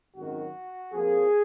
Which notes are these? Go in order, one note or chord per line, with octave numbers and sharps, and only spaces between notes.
G#1 F#2 D#3 F#4
F2 F3 A#3 G#4